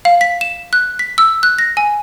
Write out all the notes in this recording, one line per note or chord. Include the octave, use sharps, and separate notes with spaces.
F5
B6
E7
F#6
B6
E6
F#6
A#6
G#5